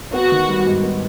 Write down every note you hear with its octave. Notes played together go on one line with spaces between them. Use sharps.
B3 F#4
D#3
G3
G#2
B3